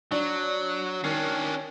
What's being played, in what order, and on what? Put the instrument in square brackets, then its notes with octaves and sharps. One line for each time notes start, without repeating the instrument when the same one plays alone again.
[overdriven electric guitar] F#3 [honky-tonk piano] D4
[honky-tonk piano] D#3 C7 [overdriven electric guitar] C#4 D4